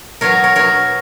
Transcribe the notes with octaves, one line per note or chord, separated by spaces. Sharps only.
B2 F#3 B3 A#4 C#5
A#4 C#5
B2 F#3 B3 A#4 C#5